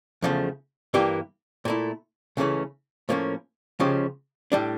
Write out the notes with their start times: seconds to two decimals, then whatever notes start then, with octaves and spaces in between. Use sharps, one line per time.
0.22 E2 C#3 F3 A3
0.94 G2 E3 A#3 E4 G4
1.65 A#2 A3 E4
2.37 C#2 C#3 E3 A3 C#4
3.09 A2 F3 A#3 C#4
3.80 C#2 C#3 F3 C#4 G4
4.52 A2 G3 D4